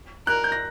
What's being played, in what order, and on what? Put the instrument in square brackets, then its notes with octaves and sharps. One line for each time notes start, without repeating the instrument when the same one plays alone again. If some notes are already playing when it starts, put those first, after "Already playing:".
[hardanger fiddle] A#4 [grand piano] F#6
[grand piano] G6
A#6